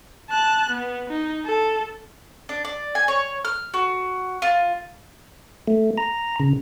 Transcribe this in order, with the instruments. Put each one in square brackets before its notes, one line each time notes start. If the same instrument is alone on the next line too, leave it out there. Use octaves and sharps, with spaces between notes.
[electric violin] A5 F#6
B3
D#4
A4
[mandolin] D4
D5
G#5
C#5
F6
F#4
F4
[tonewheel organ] A3
A#5
C#3